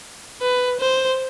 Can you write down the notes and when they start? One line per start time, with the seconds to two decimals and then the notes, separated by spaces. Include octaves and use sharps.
0.42 B4
0.80 C5